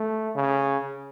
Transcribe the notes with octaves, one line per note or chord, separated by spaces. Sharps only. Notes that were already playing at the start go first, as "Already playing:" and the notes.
Already playing: A3
C#3